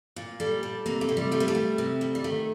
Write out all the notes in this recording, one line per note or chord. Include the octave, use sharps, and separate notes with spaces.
A#2
G3 A4
G3
C3 A#3
A3
C3
G3
G3 A3
A#3
A3
G3
C3
G3
G3
D#3 A3